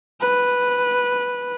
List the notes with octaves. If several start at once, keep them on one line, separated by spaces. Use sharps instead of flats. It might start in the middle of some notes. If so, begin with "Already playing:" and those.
B4